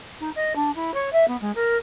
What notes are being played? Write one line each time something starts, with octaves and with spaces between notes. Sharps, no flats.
D#4
D#5
D4
E4
C#5
E5
B3
G#3
A#4